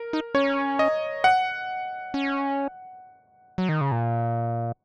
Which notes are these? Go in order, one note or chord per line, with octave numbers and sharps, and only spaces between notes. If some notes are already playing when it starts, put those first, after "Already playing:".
Already playing: A#4
D#4
C#4 C#5
D#5
F#5
C#4
F#3
D#3
C#3
A#2